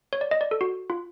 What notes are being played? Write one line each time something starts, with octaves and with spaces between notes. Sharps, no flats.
C#5
D5
D#5
D5
A4
F#4
F4